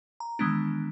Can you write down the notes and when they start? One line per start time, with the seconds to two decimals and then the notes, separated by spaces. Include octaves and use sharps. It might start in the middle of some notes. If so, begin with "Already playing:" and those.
0.20 A#5
0.39 D#3 E3 G#3 B3 D4